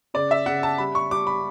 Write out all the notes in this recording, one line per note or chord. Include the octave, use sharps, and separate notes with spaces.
C#3 D5
E5
C#3 F#5
A5
G3 B5
C#6
G3 D6
B5